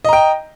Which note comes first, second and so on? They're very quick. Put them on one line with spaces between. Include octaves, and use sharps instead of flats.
D#5 A#5 G5